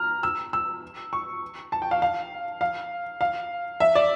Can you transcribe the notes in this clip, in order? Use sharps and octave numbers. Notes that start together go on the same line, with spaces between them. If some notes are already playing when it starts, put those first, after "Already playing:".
Already playing: A#5 F6
E6
E6
C#6
A5
G5
F5
F5
F5
F5
E5
D5